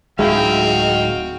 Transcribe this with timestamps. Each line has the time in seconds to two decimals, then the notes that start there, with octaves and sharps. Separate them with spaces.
0.19 D1 G#3 D#4 F#4 E5 F5 G5